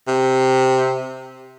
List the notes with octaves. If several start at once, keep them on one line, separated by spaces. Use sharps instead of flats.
C3